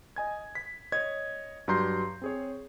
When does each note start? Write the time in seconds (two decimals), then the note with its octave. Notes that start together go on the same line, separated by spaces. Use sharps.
0.16 D#5 G#5 G#6
0.55 B6
0.92 C#5 D#5 G#6
1.68 G2 F#3 A#5 C6 G6 C7
2.22 C4 G#4 C#5